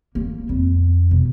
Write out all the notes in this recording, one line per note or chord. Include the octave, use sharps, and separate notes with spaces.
A#3
F2
B2